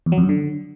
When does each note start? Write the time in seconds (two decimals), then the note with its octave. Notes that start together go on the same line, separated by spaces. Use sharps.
0.06 E2
0.12 F#3
0.18 F2
0.23 F#2
0.29 D3